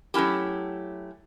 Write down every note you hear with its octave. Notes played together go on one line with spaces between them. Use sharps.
F#3 A3 C#4 E4 G4